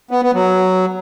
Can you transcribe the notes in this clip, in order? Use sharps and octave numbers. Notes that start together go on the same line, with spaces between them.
B3
B3
F#3